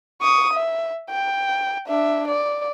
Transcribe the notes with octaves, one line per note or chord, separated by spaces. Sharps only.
C#6 D#6
E5
G5
D4 E5
D5